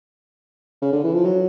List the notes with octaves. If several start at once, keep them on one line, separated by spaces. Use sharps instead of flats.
C#3
D3
E3
F3
F#3